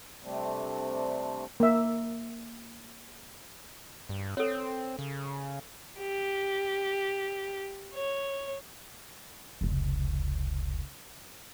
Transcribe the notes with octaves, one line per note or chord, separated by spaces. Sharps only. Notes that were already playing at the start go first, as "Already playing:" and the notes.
C3 G3 A3 C4 D4
A#3 E5
G2
C4 A4 C#5
C#3
G4
C#5
F1 C#2